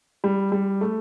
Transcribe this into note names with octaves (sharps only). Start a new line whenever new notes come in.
G3
G3
A3